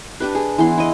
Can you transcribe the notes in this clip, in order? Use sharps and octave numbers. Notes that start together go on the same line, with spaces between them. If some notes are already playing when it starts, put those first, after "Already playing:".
D4 G4 B4
G#4
E3 B3 C6
E4 D#5